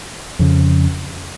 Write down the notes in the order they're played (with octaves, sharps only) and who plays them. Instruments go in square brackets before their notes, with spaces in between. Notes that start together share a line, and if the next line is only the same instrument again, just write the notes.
[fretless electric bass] F2 C#3